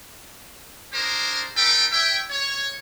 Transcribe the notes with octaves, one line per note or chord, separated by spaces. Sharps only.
D4 G#4 A#4 C5
D#4 A4 B4 G5
C#5 E5 G5
C#5